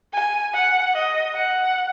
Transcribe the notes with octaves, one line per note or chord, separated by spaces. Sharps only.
G#5
F#5
D#5
F#5